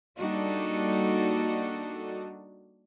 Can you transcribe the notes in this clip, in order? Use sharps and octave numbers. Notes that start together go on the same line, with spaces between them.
G3 A#3 D4 D#4 F#4 A4